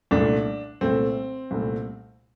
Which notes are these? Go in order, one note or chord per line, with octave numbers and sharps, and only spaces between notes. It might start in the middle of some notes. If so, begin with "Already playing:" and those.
C2 A#2 A3 D4
C2 A#2 A3 C4
C2 A#2 A3